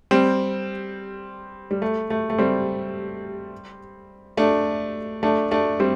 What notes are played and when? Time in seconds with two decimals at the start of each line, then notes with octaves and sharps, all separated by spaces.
0.11 G3 C4
1.71 G3
1.82 A3
2.10 A3
2.30 A3
2.38 G3 C4
4.37 A3 D4
5.23 A3 D4
5.51 A3 D4
5.80 G3 C4